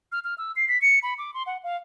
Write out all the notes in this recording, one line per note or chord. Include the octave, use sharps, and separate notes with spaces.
F6
F6
E6
C7
B6
C#7
B5
D6
C6
F#5
F5